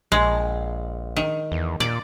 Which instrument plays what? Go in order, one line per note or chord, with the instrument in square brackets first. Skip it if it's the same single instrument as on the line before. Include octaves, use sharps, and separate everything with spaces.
[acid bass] A#1 [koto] G#3
[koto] D#3
[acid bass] E2
[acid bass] A#2 [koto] D5